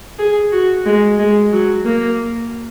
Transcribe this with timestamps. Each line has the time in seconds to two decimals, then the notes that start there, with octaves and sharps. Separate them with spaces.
0.18 G#4
0.52 F#4
0.86 G#3
1.19 G#3
1.52 F#3
1.85 A#3